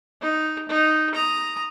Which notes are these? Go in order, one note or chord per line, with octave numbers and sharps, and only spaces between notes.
D#4
D#4
A#5 D#6